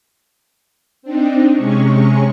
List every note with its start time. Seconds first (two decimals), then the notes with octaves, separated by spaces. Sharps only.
1.02 C4 D4 D#4
1.54 C3 G#3 C#4 C#6